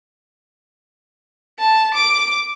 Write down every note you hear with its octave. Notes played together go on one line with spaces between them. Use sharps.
A5
D6